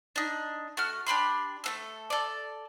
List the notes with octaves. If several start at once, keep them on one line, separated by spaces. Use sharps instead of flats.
D4 D#4
A3 F#4 F6
D4 G4 B5 C6
A3 C4 A4
A4 D5